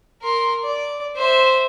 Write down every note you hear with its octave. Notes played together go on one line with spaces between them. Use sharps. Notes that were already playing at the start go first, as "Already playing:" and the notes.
A#4 C6
D5
C5 E5